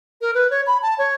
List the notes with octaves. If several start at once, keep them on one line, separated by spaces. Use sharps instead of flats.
A#4
B4
C#5
B5
A5
C#5